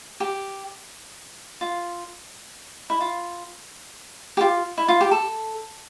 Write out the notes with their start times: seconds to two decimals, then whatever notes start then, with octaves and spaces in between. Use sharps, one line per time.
0.20 G4
1.61 F4
2.90 E4
3.01 F4
4.37 G4
4.41 F4
4.78 E4
4.88 F4
5.01 G4
5.11 A4